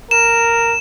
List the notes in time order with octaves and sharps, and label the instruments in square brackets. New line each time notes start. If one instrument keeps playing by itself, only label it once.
[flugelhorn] A#4 [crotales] E7